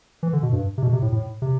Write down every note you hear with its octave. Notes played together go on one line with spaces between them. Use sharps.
E3
D3
B2
G2
C3
B2
C3
A2
A2
C3